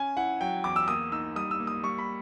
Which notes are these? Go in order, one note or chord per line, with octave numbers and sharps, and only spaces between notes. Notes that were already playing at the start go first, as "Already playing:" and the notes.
Already playing: C#4 G#5
E4 F#5
F#3 G5
E2 D6
E6
A#3 D#6
D#4 E6
G3 D#6
E6
A#3
D#6
G3 C#6
B5